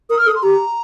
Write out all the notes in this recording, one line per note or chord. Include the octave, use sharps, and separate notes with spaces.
A#4 D#6
F6
A4 D#6
C6
G4 A#5